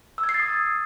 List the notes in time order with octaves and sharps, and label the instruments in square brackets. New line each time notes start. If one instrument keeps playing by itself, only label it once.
[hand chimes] E6
G#6
C7
A6
D#6